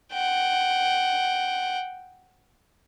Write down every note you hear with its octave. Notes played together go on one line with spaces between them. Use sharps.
F#5 G5